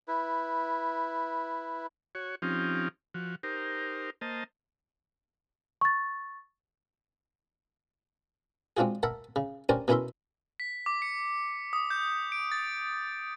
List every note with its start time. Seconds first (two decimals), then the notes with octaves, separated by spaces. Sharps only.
0.08 E4 B4
2.15 F#4 C#5
2.42 F3 C4 C#4 D#4 F4 G4
3.14 F3 F#4
3.43 D#4 G4 A#4 C5
4.21 A#3 C5 D#5 A5
5.81 C#6 A6
8.77 G#3 C4 D4 F4 F#4 G#4
9.03 A#4 E5 F#5 A5 B5
9.36 C#3
9.69 C#4 D4 G4 A#4 C5 D5
9.88 B2 C#4 E4 A#4 E5 C6
10.60 B6
10.86 D6
11.02 C#7
11.73 D#6
11.90 G6
12.32 D7
12.52 A6